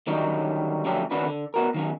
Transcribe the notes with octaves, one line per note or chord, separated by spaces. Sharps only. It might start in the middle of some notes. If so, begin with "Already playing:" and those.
D3 D#3 F#3 G3 C#4 D#4
D3 F3 F#3 A3 C#4 G4
D#3 C#4 D4 F#4 B4
D3
B3 F#4 A#4
D#3 F#3 C#4